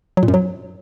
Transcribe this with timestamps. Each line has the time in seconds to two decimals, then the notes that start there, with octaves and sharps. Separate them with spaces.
0.17 F#3
0.23 A#2
0.28 F#2
0.34 F#3